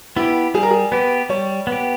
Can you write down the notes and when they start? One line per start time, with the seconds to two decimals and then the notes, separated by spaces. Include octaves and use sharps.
0.16 B3 E4 G4
0.54 G3 G#4
0.63 A#4
0.71 G#4
0.92 B3 G4 B4
1.29 G3 C#5
1.67 B3
1.72 G4